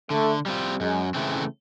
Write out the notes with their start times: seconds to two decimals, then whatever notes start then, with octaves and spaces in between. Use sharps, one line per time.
0.10 D3 A3
0.46 G3 C4 F4
0.80 F#2 G#3
1.14 C#3 E3 A3 C4